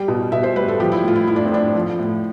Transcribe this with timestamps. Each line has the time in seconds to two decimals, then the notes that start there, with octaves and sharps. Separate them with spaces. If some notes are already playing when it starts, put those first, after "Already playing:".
Already playing: G3 G5
0.08 B2
0.32 B2 E5
0.43 C5
0.56 G3 B4
0.68 A4
0.80 F3 G4
0.92 E4
1.04 A2 F4
1.15 E4
1.27 A2 E4
1.36 D4
1.45 C4
1.51 A2 D4
1.75 F3
1.99 A2